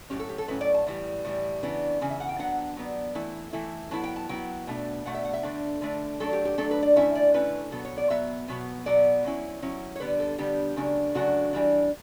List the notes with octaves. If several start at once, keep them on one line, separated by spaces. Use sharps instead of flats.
A2 F#3 C#4 G4
A4
G4
A4
A2 F#3 C#4 B4
D5
A5
A2 E3 G3
A2 E3 G3
C#3 E3 B3 D4
C#3 E3
E5
F#5
G5
F#3 B3 D4 F#5
F#3 B3 D4
E3 A3 E4
E3 A3 E4
F#3 B3 E4 A5
G5
A5
F#3 B3 E4 G5
B2 A3 D4
B2 A3 D4 F#5
E5
F#5
E5
D3 A3 D4
D3 A3 D4
F#3 A3 D4 A4
G4
G4
F#3 A3 D4 A4
B4
D5
D3 A3 C#4 E4 E5
D5
D3 A3 C#4 E4 B4
B2 F#3 B3 A4
C#5
D5
B2 F#3 B3 E5
B2 F#3 B3
B2 F#3 B3 D5
F#3 C#4 E4
F#3 C#4 E4
C#5
D3 G3 B3 D4 B4
A4
D3 G3 B3 D4 G4
C#3 F#3 A3 D4
C#3 F#3 A3 D4 F#4
E3 G3 D4